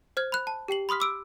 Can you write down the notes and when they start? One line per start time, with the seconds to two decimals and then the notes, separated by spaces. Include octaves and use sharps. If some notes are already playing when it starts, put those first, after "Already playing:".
0.17 C5 F6 G#6
0.32 B5 F#6
0.47 A5
0.68 G4 G5 C7 F#7
0.89 B5 C6 D#6 F6 B6
1.00 D6 E6 D7